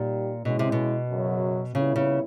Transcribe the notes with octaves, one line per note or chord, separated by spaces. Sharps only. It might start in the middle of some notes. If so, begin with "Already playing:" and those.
Already playing: A#2 G3 A#3 D#4 G4
B2 G#3 C#4 E4
C3
B2
F#2 C#3 F#3
A#2 C#3 G3 B3 E4
C#3